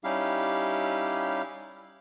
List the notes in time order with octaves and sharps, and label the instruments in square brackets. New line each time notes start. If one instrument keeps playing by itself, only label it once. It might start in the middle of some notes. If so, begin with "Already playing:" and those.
[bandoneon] G3 C#4 D#4 E4 G4 F5